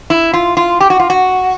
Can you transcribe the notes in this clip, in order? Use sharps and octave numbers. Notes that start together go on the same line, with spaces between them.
E4
F4
F4
G4
F#4
F4
F#4